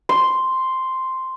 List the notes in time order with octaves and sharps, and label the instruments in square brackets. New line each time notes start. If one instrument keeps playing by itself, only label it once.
[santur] C6